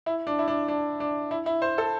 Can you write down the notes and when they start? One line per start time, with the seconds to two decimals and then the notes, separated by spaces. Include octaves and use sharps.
0.06 E4
0.27 D4
0.39 E4
0.48 D4
0.68 D4
1.00 D4
1.31 E4
1.46 E4
1.62 C5
1.78 A4